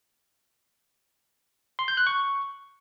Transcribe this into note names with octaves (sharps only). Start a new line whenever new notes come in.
C6
G6
F#6
C#6